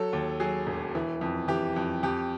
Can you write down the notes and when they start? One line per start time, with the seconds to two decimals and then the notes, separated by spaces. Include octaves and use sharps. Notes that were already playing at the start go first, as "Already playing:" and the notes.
Already playing: F#3 A4
0.13 D#2
0.40 F#3 G#4
0.67 E1
0.95 E3
1.21 F2
1.48 E3 G4
1.76 F2
2.03 F2 G4